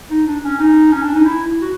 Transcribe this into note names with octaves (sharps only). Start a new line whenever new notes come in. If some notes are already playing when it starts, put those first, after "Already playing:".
D#4
D4
C#4
D#4
C#4
D4
D#4
E4
F#4